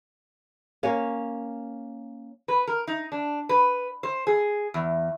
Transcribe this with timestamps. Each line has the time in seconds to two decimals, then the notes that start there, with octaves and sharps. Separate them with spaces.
0.83 A#3 C#4 C#5
2.48 B4
2.67 A#4
2.87 D#4
3.12 D4
3.49 B4
4.03 C5
4.27 G#4
4.74 E2